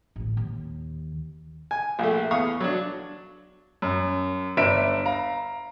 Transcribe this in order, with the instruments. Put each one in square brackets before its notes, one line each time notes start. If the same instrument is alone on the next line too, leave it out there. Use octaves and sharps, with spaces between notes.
[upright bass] A1 A#2
D#2
[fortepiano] G#5
A#1 A3
E2 F5 C#6 D#6
F#3 D4
[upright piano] F#2
G1 D4 E5 D7 E7
F5 A#5